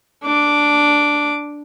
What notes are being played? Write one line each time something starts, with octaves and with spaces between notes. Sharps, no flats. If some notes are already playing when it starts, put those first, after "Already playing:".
D4 D6